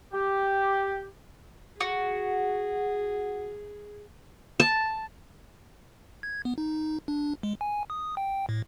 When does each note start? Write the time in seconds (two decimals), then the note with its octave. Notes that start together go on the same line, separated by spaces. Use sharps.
0.13 G4
1.81 F#4 G#4
4.60 A5
6.23 G#6
6.45 B3
6.58 D#4
7.08 D4
7.43 G#3
7.61 G#5
7.90 D#6
8.17 G5
8.49 A2